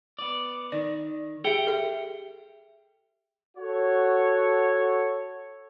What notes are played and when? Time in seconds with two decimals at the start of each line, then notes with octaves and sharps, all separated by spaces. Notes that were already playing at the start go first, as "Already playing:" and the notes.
0.19 B3 D5
0.72 D#3 D5
1.44 G4 G#4 E5 F#5 G5
1.67 A4 E5
3.57 F#4 A4 C#5